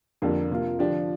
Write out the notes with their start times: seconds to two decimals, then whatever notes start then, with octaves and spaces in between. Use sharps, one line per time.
0.22 F2 D3 A#3 D4 G4
0.50 C3 A#3 F4
0.78 D3 F3 D4 G4